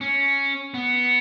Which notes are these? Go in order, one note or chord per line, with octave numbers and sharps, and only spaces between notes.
C#4
B3